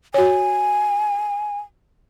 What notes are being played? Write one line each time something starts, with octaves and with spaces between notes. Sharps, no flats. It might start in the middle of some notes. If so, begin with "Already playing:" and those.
F#4 C#5 G#5